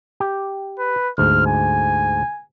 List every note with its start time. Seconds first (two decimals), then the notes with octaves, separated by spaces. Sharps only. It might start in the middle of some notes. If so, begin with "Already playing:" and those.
0.20 G4
0.79 B4
1.18 D2 G#2 F6
1.47 G#5